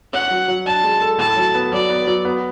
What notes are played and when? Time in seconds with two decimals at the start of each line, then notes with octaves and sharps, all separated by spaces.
0.13 C#4 F#5
0.31 F#3
0.48 F#3
0.66 D4 A5
0.84 G#3
1.02 A4
1.18 A2 A5
1.36 F#3
1.55 B3
1.72 F#3 D5
1.90 B3
2.07 F#3
2.25 B3